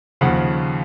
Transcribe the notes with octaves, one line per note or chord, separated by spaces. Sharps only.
D#2 C#3 F3 F#5